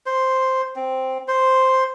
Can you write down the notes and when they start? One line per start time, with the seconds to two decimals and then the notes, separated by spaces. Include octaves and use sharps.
0.06 C5
0.76 C4
1.28 C5